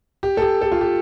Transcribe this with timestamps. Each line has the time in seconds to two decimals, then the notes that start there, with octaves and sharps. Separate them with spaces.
0.23 G4
0.37 A4
0.42 G4
0.62 A4
0.72 F4
0.81 G4